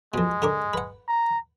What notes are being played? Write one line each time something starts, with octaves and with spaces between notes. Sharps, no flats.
F2 B2 G#3
D3 A#4 D6
B4 F#5
A#5